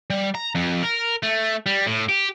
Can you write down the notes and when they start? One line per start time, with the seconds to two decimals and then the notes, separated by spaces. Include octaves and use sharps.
0.10 G3
0.35 A#5
0.55 F2
0.83 A#4
1.23 A3
1.66 G3
1.87 A2
2.09 G4